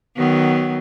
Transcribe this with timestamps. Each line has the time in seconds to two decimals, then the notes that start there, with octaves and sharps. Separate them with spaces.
0.16 D#3 F#3 B3